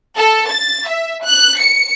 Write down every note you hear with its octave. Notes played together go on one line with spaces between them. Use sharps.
A4
A6
E5
F#6
C#7